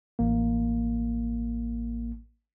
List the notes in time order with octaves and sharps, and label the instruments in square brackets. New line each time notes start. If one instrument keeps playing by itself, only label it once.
[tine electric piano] A1 A#3